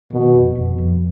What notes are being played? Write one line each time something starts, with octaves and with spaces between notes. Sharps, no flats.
B2 D#3
F1
F1
F2